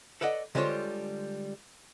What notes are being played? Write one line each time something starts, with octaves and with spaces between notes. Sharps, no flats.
A4 B4 D5 D#5 F#5
D3 G3 G#3 F4 C5 C#5